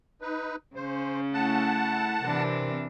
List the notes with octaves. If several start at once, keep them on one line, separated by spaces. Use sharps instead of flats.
D#4 B4
C#3 C#4 C5
A3 E4 F#5 A5
C3 E3 D4 A#4